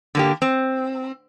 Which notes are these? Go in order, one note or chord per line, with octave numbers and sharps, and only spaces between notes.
D3 A#3 G4
C4